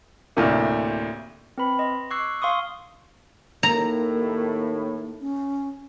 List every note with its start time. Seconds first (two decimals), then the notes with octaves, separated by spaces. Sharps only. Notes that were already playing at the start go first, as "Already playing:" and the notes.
0.37 D2 A2 C3 A#3
1.58 C4 B4 B5
1.79 D#5 C6
2.11 C#6 D6 E6 F#6 G#6 C7
2.41 F5 C6 C#6 D#6 E6
3.63 D#2 A2 A#3 A#5
5.21 C#4